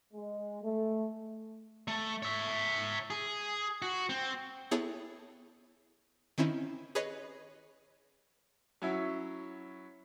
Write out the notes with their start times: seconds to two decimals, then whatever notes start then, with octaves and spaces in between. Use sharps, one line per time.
0.14 G#3
0.63 A3
1.88 A3
2.23 C#5 E5
3.10 G#4
3.82 F#4
4.09 C4
4.71 B3 E4 G#4 A4 C#5
6.38 D#3 C4 C#4 E4
6.95 G#4 B4 C#5 D#5
8.82 F#3 C#4 E4